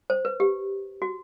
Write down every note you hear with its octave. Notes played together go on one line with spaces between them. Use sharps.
C5
B4
G4
F#4